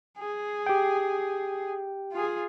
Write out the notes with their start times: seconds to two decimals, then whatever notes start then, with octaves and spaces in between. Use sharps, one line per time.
0.18 G#4
0.66 G4 G5
2.13 F4 G#4